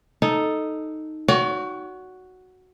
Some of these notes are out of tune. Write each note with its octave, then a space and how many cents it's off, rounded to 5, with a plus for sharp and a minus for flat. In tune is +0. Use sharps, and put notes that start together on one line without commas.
D#4 +0 A4 +0
F#4 +0 C#5 +45 G5 +0